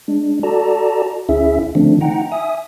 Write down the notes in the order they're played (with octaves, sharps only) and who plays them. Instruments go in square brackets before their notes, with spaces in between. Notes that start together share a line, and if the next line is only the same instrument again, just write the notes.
[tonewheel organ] G#3 D4
F#4 A4 D5 A5 A#5
D2 C#4 E4 G#4 E5
D3 D#3 F3 A3 C4 D4
D#4 F#5 G5 A#5
E5 G#5 D#6